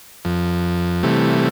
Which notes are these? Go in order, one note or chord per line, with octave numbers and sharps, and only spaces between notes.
F2
C3 E3 G3 A3